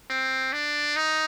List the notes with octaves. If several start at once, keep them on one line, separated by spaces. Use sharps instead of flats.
C4
D4
D#4